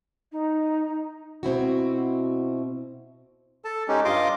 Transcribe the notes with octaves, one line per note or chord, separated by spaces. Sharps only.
D#4
B2 C4 E4 F#4
A4 A5
G#3 C#4 D#4 G4
G2 F4 D#5 C6 D6